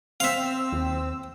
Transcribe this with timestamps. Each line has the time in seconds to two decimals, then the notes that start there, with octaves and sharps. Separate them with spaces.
0.20 C4 E5 F5 E6
0.73 D#2